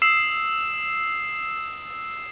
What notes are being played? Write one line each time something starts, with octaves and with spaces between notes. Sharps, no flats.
D#6 E6 C7 E7